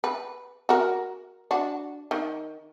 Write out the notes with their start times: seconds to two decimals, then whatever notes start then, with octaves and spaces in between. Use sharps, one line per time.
0.04 B4
0.69 F#4 A#4
1.51 D4 F#4
2.11 D#3